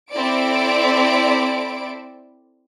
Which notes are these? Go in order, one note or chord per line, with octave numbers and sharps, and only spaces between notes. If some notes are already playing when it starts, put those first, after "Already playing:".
C4 E4 A4 D5 D7